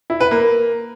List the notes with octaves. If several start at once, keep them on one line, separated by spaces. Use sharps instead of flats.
E4
B4
A#3